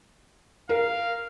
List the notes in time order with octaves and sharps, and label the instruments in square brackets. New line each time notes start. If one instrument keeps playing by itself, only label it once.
[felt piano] A#4 [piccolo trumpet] F5